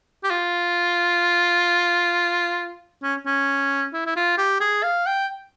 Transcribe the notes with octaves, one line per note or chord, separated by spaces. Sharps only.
G4
F4
C#4
C#4
E4
E4
F4
G4
G#4
F5
G5